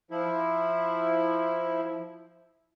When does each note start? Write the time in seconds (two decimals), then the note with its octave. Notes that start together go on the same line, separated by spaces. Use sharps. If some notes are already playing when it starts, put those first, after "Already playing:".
0.11 F3 E4